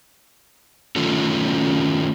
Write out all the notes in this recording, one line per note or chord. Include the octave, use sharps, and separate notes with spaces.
D#3 A3 C#4 F4 A4